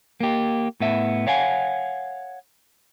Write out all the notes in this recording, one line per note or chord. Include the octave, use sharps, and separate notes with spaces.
A#3 G4
A2 B3 E5
C#5 F5 F#5 G#5